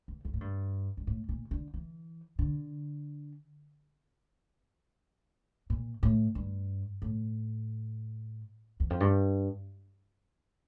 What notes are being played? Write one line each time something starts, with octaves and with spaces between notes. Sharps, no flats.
E2
F2
A2
G2
G2
A2
A#2
D3
E3
D3
A#2
A2
G2
A2
E2
F2
G2